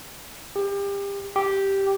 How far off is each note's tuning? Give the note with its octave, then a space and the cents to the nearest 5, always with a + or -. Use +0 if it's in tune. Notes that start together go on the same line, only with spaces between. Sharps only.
G4 +30
G4 -5